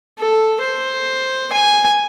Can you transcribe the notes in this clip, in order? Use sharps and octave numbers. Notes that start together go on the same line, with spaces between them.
A4
C5
G#5